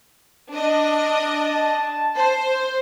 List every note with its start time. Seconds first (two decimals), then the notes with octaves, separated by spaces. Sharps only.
0.53 D4 D#5
1.30 A5
2.15 C5